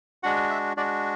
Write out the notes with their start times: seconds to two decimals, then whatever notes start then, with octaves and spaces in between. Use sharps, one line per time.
0.23 G#3 D4 F#4 F#5
0.50 E5
0.77 G#3 D4 F#4 D5